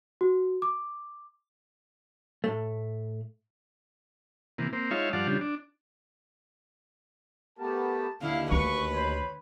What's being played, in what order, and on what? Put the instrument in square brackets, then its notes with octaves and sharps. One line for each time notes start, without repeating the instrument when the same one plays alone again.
[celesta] F#4
D6
[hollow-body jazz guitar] A2 A3
[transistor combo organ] C3 E3 A#3
A#3 C4
G#3 D#4 F4 C#5 E5 F5
G2 F3 D5 F5 F#5 A5
C#3 G3 D4 F4
D4
[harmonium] A3 B3 G4 [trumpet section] A#4 A5
[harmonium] D#2 [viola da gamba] D3 E4 [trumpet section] F5
[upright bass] D2 D3 [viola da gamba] B4 [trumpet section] C#6
[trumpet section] C5 C#5 B5